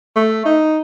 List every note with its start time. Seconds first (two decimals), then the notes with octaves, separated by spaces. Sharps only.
0.16 A3
0.46 D#4